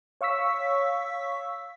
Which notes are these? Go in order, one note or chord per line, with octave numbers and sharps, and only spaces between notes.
C#5 F5 C#6 E6 B6